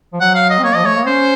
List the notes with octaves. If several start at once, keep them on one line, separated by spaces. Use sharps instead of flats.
F3
F#3 F#5
F5
D#5
C4
A#3 C#5
F3 D#5
A3 C#5
A#3
C#4 C5